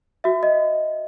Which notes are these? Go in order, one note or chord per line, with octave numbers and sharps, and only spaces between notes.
F#4 E5
D#5